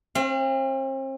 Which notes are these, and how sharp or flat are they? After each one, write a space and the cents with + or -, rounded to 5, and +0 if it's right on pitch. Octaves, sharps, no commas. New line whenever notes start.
C4 +40 F5 -35